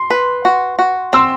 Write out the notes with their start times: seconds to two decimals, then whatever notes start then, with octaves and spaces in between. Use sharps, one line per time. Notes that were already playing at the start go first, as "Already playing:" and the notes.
Already playing: C6
0.10 B4
0.45 F#4
0.79 F#4
1.13 C4 C6 E6